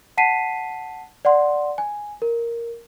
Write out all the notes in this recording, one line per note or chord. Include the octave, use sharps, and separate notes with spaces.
F#5 A5 B6 C7 D#7
D5 F#5 C6
G#5
A#4